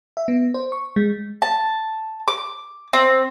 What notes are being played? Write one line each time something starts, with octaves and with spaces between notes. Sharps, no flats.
E5
B3
C5
C#6
G#3
A5
D6
C4